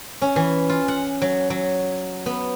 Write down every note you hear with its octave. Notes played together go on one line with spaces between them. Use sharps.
C#4
E3
F4
F#5
F#3
F#3
B3